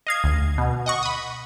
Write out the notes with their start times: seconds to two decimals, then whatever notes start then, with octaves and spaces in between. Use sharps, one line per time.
0.07 D#5 F5 G#6
0.24 D2
0.58 B2
0.86 D#5 F#5 C#6
1.03 B5 D#6